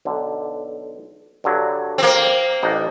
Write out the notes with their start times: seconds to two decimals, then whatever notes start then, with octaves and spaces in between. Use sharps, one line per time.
0.05 B1 D3
1.44 G2 D3 F#3
1.98 A#3 C4
2.63 A1 D4 D#4